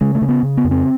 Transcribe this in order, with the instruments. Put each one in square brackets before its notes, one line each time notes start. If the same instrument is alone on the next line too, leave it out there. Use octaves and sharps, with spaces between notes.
[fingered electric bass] C#3 G#3
A3
C#3
B3
C#3
B3
F2
C4